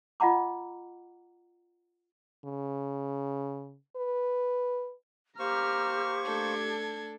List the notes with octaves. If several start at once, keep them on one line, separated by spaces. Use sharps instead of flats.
F4 D#5 F#5 A#5 D6
C#3
B4
A#3 G4 C5 A#5 C#6 F6
A3 D4 A4 G#6